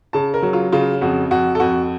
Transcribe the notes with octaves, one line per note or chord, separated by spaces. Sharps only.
C#3 A5
A#4
F#3
F4
C#3 F4
F2 F#4
F2 F#4
A4
F2 F#4